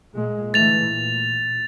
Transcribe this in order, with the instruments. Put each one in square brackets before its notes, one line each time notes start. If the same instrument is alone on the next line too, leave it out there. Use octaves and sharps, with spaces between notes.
[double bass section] A#2 G#3
[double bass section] D3 E3 A3 [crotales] A6 F7
[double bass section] A#2